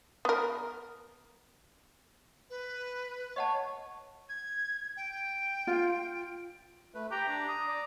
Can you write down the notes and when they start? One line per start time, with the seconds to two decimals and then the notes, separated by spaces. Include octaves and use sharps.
0.25 B3 A#4
2.50 B4
3.36 C#5 D#5 F#5 A5
4.29 G#6
4.97 G5
5.67 F4
6.94 A3 B4
7.11 G4 A#5
7.29 D4
7.48 D#6
7.68 D5